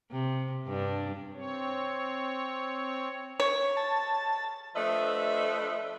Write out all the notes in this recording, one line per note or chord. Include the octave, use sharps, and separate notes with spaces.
C3
G2 D4
C4 C#5
C#5
A5
F3 A3 D4 B4 D#5 E5